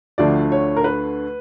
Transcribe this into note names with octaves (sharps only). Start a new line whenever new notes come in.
D2 D3 F3 A3 D5
C#5
A#4
B4